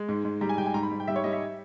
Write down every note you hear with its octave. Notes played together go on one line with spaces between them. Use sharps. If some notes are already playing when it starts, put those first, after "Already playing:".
Already playing: G#3
G#2
G#2
G3 A#5
G#5
G3 G5
G#5
G#2 A#5
B5
G#2
G5
G3 E5
C#5
G3 D#5
E5